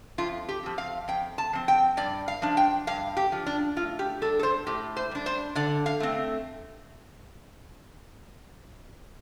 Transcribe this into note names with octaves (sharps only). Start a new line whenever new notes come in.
F2 F4
G4
F3 C4
F5
F2 G5
A5
F3 C4
G5
G2 D5
F5
F3 D4
G5
G2 F5
G4
F3 D4
D4
A2 F4
G4
G3 D4 A4
A4
C5
A2 G4
C5
G3 D4
C5
D3 D5
F5
A3 C4